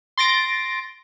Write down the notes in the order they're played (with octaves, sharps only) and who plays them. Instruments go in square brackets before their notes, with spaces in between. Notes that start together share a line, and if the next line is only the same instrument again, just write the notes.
[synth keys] C6 A6 A#6 D7